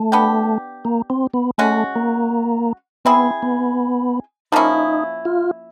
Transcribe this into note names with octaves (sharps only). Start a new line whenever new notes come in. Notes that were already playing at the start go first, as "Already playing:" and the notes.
Already playing: A3
B3 D4 G4
A#3
C4
B3
G#3 A3 C#4 F#4
A#3
B3 C4 E4 G#4
B3
F3 A#3 C#4 D#4 E4
F4